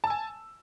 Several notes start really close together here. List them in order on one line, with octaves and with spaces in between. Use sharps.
A5 E6 G#5